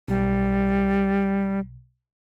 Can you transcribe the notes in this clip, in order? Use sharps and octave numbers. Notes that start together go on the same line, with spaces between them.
B1 G3